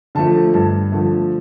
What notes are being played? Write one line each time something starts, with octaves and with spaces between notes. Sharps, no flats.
D3 F3 A3 A5
G2 A5
D3 F3 A3